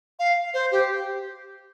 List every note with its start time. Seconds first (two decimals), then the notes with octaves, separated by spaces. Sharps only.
0.19 F5
0.54 C5
0.72 G4